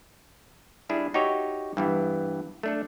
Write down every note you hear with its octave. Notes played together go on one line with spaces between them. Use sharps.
G3 D4 E4 G#4
D#4 F#4 G4 C#5 E5
G2 E3 B3
A3 D4 A4